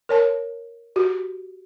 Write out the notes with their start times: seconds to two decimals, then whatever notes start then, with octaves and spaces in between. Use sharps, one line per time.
0.09 A#4 C#5 A5
0.96 F#4 G4